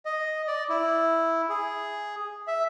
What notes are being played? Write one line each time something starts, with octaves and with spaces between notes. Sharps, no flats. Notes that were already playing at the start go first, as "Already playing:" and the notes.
D#5
D5
E4
G#4
E5